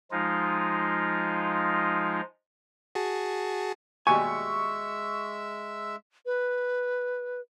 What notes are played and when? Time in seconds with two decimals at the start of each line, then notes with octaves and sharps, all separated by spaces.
0.11 F3 G#3 D#4 F4
2.95 F#4 G#4 A5
4.07 D#2 B2 G3 G#3 E5 G#5 C#6 E6
6.26 B4